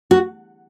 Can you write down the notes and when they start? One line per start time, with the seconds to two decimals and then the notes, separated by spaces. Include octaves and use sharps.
0.11 F#4